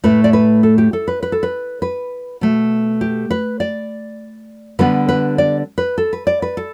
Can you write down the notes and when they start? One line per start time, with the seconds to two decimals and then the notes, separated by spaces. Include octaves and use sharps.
0.04 A2 A3 B4
0.24 D5
0.33 B4
0.63 A4
0.78 G4
0.93 A4
1.08 B4
1.23 B4
1.32 A4
1.43 B4
1.82 B4
2.41 B2 A3
3.01 G4
3.31 B4
3.60 D5
4.79 D3 G3 B3 B4
5.09 B4
5.38 D5
5.78 B4
5.98 A4
6.13 B4
6.27 D5
6.42 B4
6.57 A4